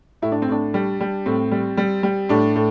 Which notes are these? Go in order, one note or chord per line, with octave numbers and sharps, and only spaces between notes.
A2 E4
D4
C4
A2 D4
G3
G3
A2 C4
G3
G3
G3
A2 D4
A2